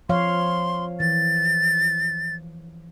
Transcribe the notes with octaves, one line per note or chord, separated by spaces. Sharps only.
F3 C#5 F5 C6
E3 A6